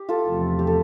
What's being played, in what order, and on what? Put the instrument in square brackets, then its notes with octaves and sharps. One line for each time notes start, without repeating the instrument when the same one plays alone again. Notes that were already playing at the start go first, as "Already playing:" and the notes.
Already playing: [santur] G4
F4 A4
[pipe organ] E2 C3 F3 A3
[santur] G4
A4